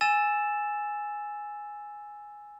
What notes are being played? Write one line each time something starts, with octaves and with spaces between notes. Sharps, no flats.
G#5 E6 A6 E7